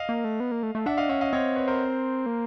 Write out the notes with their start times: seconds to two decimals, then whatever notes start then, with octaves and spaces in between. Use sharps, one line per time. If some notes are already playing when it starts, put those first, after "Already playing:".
Already playing: D#5 F5
0.09 A#3
0.24 A3
0.40 B3
0.52 A#3
0.63 A3
0.75 A3
0.86 D4 E5 F#5
0.98 D#5 F5
1.09 C#4 E5 F#5
1.21 D#5 F5
1.33 C4 C#5 D#5
1.56 B4 C#5
1.68 A#4 C5
2.26 A#3